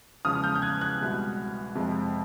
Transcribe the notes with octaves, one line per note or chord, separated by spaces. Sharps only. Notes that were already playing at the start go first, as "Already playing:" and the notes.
E2 C#3 F3 G#3 D#6 F6
F6 G6
G6
F#6 G#6
F#6 G#6
C2 B2 G#3
F2 C3 F3 G#3